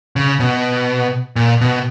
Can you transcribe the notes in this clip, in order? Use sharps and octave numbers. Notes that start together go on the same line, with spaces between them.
C#3
B2
A#2
B2